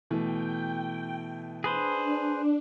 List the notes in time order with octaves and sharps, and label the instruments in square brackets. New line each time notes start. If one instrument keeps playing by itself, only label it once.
[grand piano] B2 E3 A3 [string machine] G5
[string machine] D4 [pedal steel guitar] G#4 B4 C5